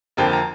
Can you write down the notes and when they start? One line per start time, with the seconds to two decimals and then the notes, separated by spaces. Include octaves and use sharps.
0.17 F2 D3 F3 A#3 G5
0.33 A#5